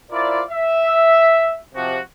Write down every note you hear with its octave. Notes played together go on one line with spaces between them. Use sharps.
E4 F4 A#4 C5 D5
E5
C3 F3 F#4